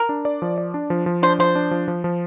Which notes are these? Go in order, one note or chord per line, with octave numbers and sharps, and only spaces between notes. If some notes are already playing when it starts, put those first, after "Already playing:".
Already playing: A#4
D4
D5
F3
D5
D4
F3
F3
D4 C5
F3 C5
D4
F3
F3
F3